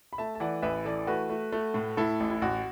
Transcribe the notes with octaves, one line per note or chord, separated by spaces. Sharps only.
B5
A3 E5 A5
A5
E3 D5 F#5
A1 B4 E5
E3 A4 D5
A3 F#4 B4
A3
A3
A2
A2 E4 A4
A1
E4
A1 F#4